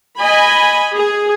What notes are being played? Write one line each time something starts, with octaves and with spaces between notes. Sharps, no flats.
D#5 G#5 B5
G#4